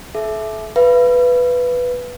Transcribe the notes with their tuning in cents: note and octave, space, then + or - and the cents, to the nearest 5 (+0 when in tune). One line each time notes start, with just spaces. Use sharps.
A4 -40 E5 +0
B4 +0 F5 -40